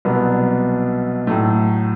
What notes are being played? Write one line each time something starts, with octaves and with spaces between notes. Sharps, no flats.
C2 B2 F#3 B3
A2 F#3 A3